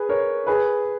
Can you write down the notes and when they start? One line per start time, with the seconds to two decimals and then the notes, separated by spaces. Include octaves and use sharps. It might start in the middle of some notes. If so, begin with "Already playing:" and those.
Already playing: G#4 B4
0.09 A#4 C#5
0.47 G#4 B4